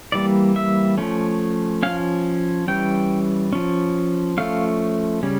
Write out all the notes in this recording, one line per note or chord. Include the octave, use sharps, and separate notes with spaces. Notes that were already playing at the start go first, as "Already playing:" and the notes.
E3 G3 A#3 D5
E5
F3 A3 C#4
F3 C#4 F5
E3 G3 C#4 G5
F3 C#4
F3 A3 C#4 F5
C#3 G3 C#4